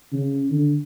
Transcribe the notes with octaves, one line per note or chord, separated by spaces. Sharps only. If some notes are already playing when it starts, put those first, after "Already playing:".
C#3
D3